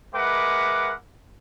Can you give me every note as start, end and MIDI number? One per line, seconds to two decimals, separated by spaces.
0.14 0.91 56
0.14 0.91 70
0.14 0.91 71
0.14 0.91 76
0.14 0.91 78
0.14 0.91 86